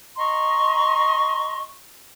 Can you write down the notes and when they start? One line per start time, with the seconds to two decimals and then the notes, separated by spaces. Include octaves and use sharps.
0.17 D#5 A#5 C6 C#6